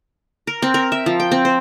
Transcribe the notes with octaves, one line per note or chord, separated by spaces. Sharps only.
A#4
C4
A#4
E5
F3
G5
C4
C5